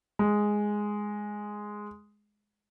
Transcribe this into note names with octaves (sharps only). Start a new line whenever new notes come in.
G#3